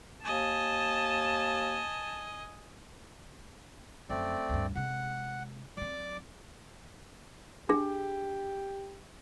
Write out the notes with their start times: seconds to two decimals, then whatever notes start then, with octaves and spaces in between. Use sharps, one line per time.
0.24 D#2 D#5 G#5 A5
4.09 F#2 F3 A3 C4 D5
4.49 D2 G2
4.75 C3 G#3 F#5
5.77 F#3 C4 D5 D6
7.69 D4 G4 G#4